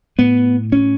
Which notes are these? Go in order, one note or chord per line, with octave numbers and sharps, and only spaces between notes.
A2 B3
C#4